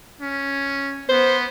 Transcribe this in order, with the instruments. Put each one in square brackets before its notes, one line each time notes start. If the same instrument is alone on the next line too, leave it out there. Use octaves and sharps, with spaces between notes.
[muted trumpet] C#4
[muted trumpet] B3 [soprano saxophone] C5